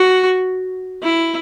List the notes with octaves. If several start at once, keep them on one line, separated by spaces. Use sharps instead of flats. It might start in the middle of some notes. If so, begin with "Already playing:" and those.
Already playing: F#4
E4